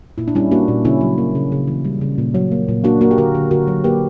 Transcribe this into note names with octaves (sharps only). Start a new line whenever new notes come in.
A#2 E4
D4
G3 C#4 E4
A#3 D4 F#4
A#2
C#3 C#4 E4
F#3
A#3
C#3
C#3
E3
G3
C#3
A#2
F#3
A#3
A#2
A#3 D4 F#4
A#3 F#4 A#4
G4
D3 F#4 A#4
D3
D3 F#4 A#4
F#3
A#3 G4 B4